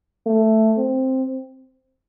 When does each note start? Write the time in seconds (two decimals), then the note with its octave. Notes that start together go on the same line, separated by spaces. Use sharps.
0.26 A3
0.78 C4